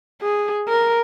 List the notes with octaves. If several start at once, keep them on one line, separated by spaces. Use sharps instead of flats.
G#4
A#4